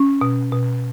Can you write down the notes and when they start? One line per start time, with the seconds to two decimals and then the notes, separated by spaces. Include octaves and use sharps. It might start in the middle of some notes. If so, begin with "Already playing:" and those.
Already playing: C#4
0.21 B2
0.52 B2